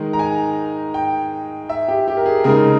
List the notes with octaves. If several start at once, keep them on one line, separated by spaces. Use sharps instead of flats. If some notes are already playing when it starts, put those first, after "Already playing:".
Already playing: D#3 G#3 D#4
A#5
G#5
G5
E5
G4
G4
A#4
G#4
C#3 G#3 D#4 A#4